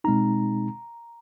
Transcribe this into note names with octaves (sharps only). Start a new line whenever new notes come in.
B2 G#3 C4 D#4 A#5